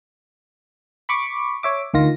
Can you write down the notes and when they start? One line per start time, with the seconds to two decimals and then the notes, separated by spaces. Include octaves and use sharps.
1.09 B5 C#6 D6
1.63 C#5 E5 D6
1.94 D2 D#3 F4 A#6